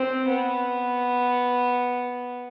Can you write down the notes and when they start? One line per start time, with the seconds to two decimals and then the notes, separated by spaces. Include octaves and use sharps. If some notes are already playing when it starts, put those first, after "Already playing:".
Already playing: C4
0.28 B3